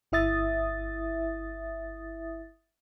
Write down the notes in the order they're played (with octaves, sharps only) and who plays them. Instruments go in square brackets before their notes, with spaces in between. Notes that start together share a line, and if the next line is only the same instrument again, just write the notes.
[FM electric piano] G1 E4 E5 D#6 A6